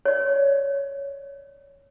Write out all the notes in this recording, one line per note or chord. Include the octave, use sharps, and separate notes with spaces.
C#5 D5